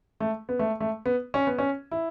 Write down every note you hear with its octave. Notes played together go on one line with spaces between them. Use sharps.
A3
B3
A3
A3
B3
C#4
B3
C#4
E4